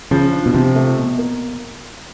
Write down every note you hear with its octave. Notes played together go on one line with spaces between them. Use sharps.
C#3 F3
D4
B2
C3 F3
A3
B2
A#3